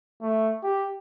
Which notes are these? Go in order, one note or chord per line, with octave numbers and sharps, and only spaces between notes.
A3
G4